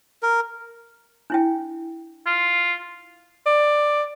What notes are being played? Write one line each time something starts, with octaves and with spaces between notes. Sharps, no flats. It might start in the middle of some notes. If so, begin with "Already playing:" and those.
A#4
D4 E4 G5
F4
D5